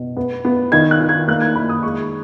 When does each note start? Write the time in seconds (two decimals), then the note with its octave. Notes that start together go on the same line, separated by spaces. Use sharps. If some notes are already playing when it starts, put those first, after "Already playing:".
Already playing: B2
0.17 B3
0.45 B3
0.72 D#3 G#6
0.91 F#6
1.00 D#3
1.09 G#6
1.28 A#3 F#6
1.41 G#6
1.56 D#3 B5
1.69 D#6
1.83 G#3 C#6